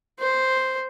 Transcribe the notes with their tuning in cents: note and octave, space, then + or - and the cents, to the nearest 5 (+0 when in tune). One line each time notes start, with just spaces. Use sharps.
C5 +0